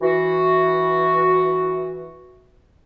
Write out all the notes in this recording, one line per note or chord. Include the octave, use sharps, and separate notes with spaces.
E3 F#4